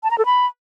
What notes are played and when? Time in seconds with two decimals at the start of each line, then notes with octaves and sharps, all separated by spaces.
0.03 A5
0.11 A#5
0.18 A4
0.26 B5